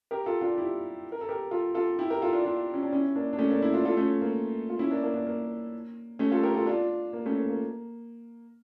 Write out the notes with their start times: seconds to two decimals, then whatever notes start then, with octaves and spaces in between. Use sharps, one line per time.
0.11 G4 A#4
0.26 F4 A4
0.41 D4 F4
0.58 E4 G4
1.12 A#4
1.21 A4
1.29 G4 A#4
1.51 F4 A4
1.75 F4 A4
1.99 E4 G4
2.10 G4 A#4
2.22 F4 A4
2.33 D4 F4
2.45 D4 F4
2.74 C#4
2.83 D4
2.92 C#4 E4
3.15 A#3 D4
3.33 D4
3.39 A3 C#4
3.50 A#3 D4
3.62 C#4 E4
3.73 D4 F4
3.85 F4 A4
3.97 A3 C#4
4.21 A#3
4.70 F4
4.79 C#4 E4
4.91 A#3 D4
5.03 A#3 D4
5.14 A#3 D4
5.26 A#3
6.19 A3 C#4
6.32 F4 A4
6.43 G4 A#4
6.54 F4 A4
6.66 D4 F4
7.13 A#3
7.26 A3 C#4
7.38 A#3
7.49 A#3